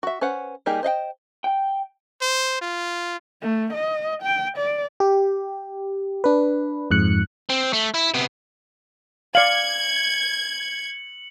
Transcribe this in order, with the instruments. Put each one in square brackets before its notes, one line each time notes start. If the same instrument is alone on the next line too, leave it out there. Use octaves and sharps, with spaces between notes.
[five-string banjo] F#4 E5
C#4 B4 C5 F#5
G3 A#3 D#4 G4 G#4
C5 D#5 F5 G5
[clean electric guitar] G5
[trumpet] C5
F4
[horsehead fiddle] A3
D#5
G5
D5
[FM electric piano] G4
D4 B4
F2 G#2 F#6 C#7
[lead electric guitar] C4
A3
E4
C3 B3
[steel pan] D5 F5 [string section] G#6 [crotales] C#7 F#7